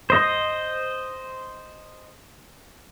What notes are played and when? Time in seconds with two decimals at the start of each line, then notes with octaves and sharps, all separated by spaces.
0.10 C5 D#5